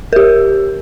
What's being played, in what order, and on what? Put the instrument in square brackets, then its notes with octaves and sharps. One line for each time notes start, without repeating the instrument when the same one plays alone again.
[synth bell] G4 A#4